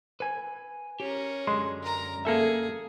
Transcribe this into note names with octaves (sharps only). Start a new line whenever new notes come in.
B4 G#5
C#4 G4 A#4
F#2 D3 G#3 C6
A#4 A#5
A#3 G#4 A4 E5